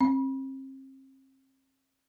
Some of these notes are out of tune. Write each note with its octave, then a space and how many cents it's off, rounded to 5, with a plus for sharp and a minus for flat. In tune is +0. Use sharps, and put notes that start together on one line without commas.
C4 +35